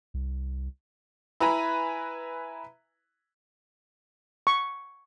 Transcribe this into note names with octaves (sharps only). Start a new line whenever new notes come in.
C2
E4 B4 G#5 A#5 B5
C#6